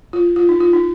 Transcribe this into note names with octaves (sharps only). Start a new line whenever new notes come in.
F4
F4
D#4
F4
D#4